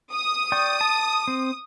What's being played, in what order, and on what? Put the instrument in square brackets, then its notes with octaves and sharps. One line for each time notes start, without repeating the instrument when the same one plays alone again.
[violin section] D#6
[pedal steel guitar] D5 G5 C#6
A5
C4